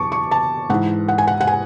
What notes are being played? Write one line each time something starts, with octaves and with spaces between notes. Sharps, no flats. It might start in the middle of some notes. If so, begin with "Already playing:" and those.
Already playing: E2 B2 F#3 A5 C#6 D6
C#6
A5
G#2 E3 F#5
F#5
G#5
F#5
F#5
G#5